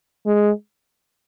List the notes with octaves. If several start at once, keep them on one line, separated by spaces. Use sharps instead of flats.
G#3